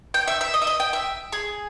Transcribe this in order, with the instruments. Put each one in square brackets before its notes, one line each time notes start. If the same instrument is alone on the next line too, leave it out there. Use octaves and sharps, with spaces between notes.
[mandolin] G5
E5
E5
D#5
E5
D#5
G5
E5
G#4